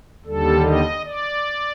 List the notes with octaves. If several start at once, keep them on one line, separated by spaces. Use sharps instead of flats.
D#2 D3 G3 A4
D#5
D5